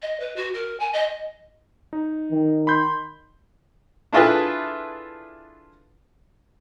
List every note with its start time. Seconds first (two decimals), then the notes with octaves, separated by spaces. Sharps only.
0.02 D#5
0.20 B4
0.36 F#4
0.54 A#4
0.79 G#5
0.93 D#5
1.93 D#4
2.31 D#3
2.67 B5 C6 G6
4.13 D4 E4 F4 G#4 A4 B4